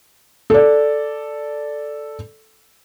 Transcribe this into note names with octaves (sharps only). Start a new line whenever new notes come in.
A4 D5